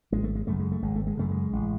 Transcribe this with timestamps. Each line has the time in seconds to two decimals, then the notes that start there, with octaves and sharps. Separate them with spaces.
0.12 G#1 G#3
0.24 A3
0.35 G#3
0.47 F#2 C#3 A3
0.59 G#3
0.72 A3
0.82 G#1 G#3
0.96 A3
1.07 G#3
1.17 F#2 C#3 A3
1.31 G#3
1.53 A1